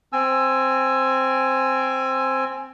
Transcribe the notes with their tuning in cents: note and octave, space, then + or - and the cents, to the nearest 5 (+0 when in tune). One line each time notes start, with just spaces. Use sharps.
C4 +0 G#5 +0 E6 +20